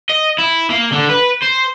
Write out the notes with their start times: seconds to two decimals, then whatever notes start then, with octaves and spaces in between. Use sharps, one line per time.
0.09 D#5
0.38 E4
0.70 A#3
0.92 D3
1.09 B4
1.42 C5